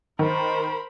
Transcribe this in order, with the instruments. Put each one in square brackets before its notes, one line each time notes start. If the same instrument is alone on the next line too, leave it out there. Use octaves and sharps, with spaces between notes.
[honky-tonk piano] D#3 [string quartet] A#4 C5 B5